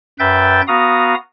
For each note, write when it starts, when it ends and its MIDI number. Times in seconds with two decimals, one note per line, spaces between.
0.19 0.61 42
0.19 0.61 71
0.19 0.61 76
0.19 0.61 79
0.19 0.61 91
0.19 0.61 93
0.68 1.15 59
0.68 1.15 66
0.68 1.15 77
0.68 1.15 82
0.68 1.15 87